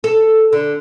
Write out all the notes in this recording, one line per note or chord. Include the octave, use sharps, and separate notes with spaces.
A4
D3